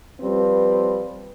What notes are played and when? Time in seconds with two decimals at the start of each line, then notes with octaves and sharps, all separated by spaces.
0.21 F3 G3 C4 B4